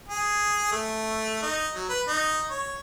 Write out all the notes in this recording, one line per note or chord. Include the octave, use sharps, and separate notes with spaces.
G#4
A3
D#4
F#3
B4
D#4
C#5